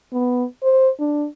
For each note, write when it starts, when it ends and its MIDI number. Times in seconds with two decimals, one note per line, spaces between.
0.13 0.45 59
0.63 0.89 72
1.00 1.26 62